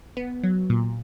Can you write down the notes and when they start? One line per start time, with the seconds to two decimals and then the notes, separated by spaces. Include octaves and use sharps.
0.17 B3
0.44 F#3
0.70 A#2